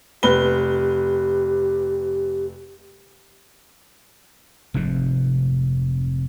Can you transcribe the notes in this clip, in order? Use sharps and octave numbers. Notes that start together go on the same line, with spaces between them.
F1 G4 B4 G7
F1 F2 G#2 C3